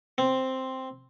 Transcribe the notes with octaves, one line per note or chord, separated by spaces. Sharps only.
C4